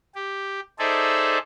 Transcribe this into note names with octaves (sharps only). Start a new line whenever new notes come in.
G4
D#4 G#4 A4 C5 D5 E5